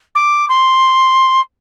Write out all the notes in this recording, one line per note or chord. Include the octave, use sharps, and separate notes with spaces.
D6
C6